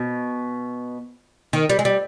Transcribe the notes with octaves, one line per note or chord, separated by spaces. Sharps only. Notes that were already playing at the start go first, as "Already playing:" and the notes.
Already playing: B2
D#3
G3
G#3
G3